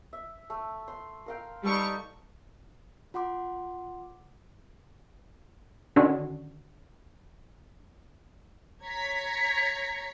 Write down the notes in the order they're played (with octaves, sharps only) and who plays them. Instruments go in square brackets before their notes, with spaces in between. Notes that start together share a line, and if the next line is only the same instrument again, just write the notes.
[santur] E5
A3
C6
A#4 F5 G5
[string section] G3 C#6 [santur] D#4 A4 B4
[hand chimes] F4 F#5 C6 D6
[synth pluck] D3 D#3 C#4 D4 F#4
[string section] C#5 A#5 G#6 B6 C#7